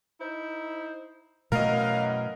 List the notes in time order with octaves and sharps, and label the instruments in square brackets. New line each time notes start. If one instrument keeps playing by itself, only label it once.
[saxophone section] D#4 E4 C5
[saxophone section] F#2 E3 F#3 [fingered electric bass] B2 A3 [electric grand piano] A#4 D#5 [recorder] F5